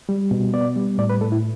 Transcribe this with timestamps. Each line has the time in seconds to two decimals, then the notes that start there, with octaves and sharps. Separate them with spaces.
0.09 G3
0.31 B2
0.53 B3 D5
0.76 G3
0.98 A2 D5
1.10 B4
1.21 A2 A4
1.32 E4